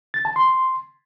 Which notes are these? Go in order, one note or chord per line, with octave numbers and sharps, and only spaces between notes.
A6
A5
C6